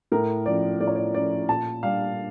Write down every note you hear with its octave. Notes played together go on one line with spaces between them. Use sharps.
A2 A#4
F3 C#4 D5
A2 D5
C#5
D5
F3 C#4 D5
A#2 A5
G3 D4 F5